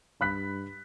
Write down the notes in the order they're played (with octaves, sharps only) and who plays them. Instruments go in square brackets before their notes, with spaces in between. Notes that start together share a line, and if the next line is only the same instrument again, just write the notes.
[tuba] G2 [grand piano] B5 F#6 B6